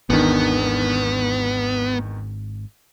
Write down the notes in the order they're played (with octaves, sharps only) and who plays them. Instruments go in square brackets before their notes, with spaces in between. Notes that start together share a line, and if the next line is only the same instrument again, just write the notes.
[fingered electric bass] G#1 D4 [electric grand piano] E2 D#3 [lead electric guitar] B3